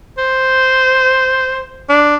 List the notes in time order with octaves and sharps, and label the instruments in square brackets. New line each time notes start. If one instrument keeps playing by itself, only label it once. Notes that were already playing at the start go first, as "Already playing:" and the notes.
[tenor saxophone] C5
D4